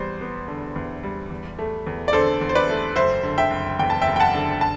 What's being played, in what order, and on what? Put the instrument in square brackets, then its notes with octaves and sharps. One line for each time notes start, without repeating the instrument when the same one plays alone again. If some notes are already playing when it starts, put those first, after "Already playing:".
Already playing: [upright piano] E2 G3 C5
B3
D3
E2
G3
E2
A3
E2
D5
D3 A4 C5
E2
C5
B4 D5
A3
F#1 C5 E5
D3
E5 G5
F#1
E2 G5
A5
E5 G5
F#1
G5
F#5 A5
D3
A5